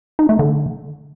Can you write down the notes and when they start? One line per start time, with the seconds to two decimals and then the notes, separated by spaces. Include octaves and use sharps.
0.19 D#4
0.29 A3
0.39 D3